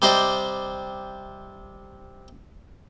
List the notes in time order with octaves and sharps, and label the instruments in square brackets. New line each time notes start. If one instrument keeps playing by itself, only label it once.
[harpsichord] C3 G3 C5 D5 D#5 G5